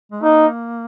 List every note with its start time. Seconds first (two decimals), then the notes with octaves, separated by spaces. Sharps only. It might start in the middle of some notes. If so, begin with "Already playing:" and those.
0.12 G#3
0.23 A#3 D#4